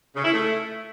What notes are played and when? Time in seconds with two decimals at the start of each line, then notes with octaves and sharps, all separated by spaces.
0.16 C#3
0.25 E4
0.33 A3